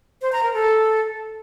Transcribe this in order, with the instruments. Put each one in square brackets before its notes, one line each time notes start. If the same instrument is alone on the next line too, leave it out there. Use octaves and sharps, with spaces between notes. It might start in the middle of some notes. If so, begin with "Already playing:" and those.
[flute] C5
A#5
A#4
A4